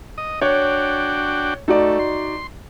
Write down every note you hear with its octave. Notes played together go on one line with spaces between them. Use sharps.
D#5
D4 F#4 C#5 G5
A3 D#4 F#4 D5
C6